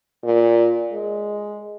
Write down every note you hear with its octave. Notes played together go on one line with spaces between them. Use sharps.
A#2
G#3